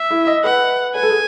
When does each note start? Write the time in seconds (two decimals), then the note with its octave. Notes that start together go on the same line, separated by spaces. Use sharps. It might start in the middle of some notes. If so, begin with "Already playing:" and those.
Already playing: E5
0.10 E4
0.27 D#5
0.44 B4 F#5
0.95 B4 G#5
1.03 A4
1.10 G#4